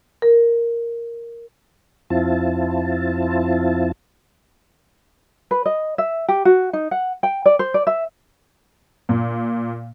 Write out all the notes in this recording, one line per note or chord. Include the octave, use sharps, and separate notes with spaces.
A#4
F2 C4 E4 F4 A5
B4
D#5
E5
G4
F#4
D#4
F#5
G5
D5
C5
D5
E5
A#2